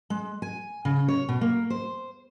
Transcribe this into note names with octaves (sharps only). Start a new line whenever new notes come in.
G#3
G#5
C#3
C#5
B2
A#3
C5